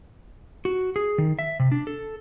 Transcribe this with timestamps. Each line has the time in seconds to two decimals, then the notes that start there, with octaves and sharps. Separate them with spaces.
0.65 F#4
0.96 G#4
1.18 D#3
1.39 E5
1.59 C3
1.72 D4
1.87 A4